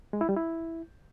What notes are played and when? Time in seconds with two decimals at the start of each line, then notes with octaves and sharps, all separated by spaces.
0.13 G#3
0.21 E4
0.29 G3
0.37 E4